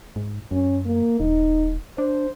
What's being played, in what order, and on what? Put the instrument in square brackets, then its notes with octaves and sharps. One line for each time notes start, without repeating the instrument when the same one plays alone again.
[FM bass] G#2
[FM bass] F#2 [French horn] C#4
[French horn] A#3
[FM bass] D#1 [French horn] D#4
[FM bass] D4 [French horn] C5